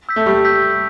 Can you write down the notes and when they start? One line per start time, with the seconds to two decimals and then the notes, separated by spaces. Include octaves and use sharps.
0.09 E6 G6 B6
0.16 A3
0.26 G3 C#6
0.45 E6 G6 B6
0.62 G6